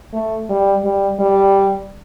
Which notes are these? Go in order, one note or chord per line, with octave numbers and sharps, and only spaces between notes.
A3
G3
G3
G3